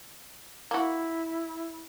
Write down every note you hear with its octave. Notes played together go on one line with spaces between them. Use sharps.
A#3 E4 F#4